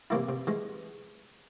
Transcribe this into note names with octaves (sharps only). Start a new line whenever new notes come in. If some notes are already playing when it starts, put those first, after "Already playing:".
C3 E3 A#3 E4
C3
E3 G#3